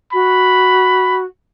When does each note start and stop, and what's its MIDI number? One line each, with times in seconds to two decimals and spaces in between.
0.13 1.24 66
0.13 1.19 83